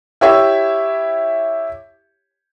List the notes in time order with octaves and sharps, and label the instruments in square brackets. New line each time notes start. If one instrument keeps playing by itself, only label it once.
[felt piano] E4 G4 C#5 E5